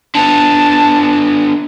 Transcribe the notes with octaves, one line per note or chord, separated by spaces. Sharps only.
D3 B3 A5